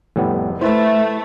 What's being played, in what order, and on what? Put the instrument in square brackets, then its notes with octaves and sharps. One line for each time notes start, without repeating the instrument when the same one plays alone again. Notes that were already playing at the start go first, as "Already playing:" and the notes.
[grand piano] F1 [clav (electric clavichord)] A2 G3 B3
[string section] A3 [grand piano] E4 B4 E5 [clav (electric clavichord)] C5